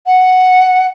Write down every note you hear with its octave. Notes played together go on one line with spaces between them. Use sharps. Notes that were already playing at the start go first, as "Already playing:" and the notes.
F#5